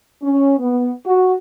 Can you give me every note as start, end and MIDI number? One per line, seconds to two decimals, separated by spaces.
0.22 0.58 61
0.58 0.92 59
1.05 1.34 66